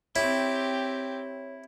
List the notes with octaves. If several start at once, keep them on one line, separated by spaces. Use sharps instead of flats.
C4 E4 G4 C#5